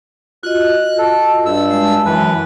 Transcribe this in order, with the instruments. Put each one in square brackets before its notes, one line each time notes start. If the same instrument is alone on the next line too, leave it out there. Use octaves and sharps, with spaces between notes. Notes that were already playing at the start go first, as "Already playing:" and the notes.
[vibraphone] F4 F#4 D#5 [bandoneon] F#6
[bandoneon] A4
G2 E6
[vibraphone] G#3 A5
[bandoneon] F#2 E3 B4